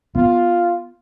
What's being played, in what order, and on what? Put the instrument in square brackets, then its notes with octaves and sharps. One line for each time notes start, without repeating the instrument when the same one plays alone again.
[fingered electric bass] B3 [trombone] F4